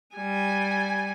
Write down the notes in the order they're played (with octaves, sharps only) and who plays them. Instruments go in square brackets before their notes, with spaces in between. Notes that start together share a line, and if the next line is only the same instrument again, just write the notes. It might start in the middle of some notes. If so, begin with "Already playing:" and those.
[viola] G3 G#5